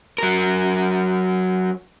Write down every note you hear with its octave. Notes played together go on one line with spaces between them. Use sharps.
F#3 A#4